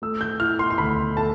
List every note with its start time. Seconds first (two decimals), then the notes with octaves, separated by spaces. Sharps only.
0.02 A3 E6
0.21 G6
0.40 E4 F6
0.59 C6
0.70 C6
0.78 D2 B5
1.16 A3 A5